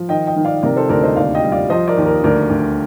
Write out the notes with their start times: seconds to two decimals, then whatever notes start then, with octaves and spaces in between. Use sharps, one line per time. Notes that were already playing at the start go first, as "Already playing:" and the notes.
Already playing: F3
0.09 D#3 D#5 G5
0.27 D#5 G5
0.36 D#3
0.45 D5 F5
0.63 C3 A#4 D5
0.76 A4 C5
0.89 D2 A#4 D5
1.03 C5 D#5
1.16 D#2 D5 F5
1.34 D#5 G5
1.44 G3
1.52 D5 F5
1.70 F3 C5 D#5
1.88 A#4 D5
1.97 D#2
2.06 A#4
2.24 D2 A#4 D5
2.50 D2